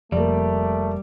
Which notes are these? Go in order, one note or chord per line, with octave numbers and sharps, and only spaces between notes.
F1 F3 G3 A3 A#3 D5